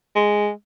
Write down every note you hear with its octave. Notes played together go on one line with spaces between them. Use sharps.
G#3